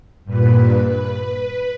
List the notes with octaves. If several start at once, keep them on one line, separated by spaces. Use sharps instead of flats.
G2 A#2 B4
B4